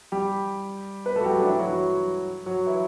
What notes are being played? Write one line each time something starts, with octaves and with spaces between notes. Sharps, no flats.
G3 G4
B3 B4
A3 A4
F#4
G3 G4
F#3 F#4
D4
E3 E4
F#3 F#4
F#3 F#4
F#3 F#4
E3 E4